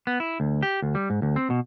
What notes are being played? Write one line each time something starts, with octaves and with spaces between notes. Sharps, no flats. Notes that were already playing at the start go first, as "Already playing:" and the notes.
B3
E4
D2
G4
D2
G3
G#2
D2
C4
B2